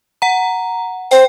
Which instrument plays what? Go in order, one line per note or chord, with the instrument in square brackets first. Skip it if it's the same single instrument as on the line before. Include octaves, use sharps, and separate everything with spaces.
[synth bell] F#5 A#5
[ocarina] C5 [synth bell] G5